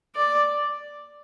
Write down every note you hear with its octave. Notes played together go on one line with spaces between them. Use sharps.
D5